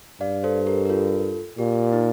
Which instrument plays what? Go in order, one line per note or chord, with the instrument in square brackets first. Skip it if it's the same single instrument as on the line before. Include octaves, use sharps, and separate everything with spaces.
[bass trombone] G2 [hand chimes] D5 F5
[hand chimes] A4 C5
G4 A#4
A#4
F4 A4
[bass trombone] A#2 [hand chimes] G4
[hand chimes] D#4